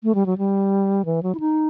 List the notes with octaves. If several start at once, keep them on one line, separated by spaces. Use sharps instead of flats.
A3
G3
F#3
G3
E3
F#3
E4
D#4